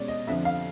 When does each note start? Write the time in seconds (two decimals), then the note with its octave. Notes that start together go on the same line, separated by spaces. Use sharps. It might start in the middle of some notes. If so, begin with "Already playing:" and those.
Already playing: B2 G#3 C#4 D5
0.08 D#5
0.27 F2 D3 F3 E5
0.45 F5